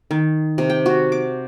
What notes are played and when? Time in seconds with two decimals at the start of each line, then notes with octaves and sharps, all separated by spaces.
0.11 D#3
0.58 C3
0.70 G5
0.86 F#4
1.12 D6